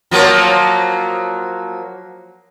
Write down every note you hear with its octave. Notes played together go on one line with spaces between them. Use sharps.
F3 F#3 A#3